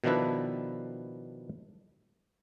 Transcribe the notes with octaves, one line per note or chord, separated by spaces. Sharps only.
B2 D#3 F3 D4 E4 B4